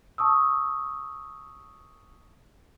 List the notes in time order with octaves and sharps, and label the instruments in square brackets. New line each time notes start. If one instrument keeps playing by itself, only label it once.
[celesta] A5 C#6 D#6 E6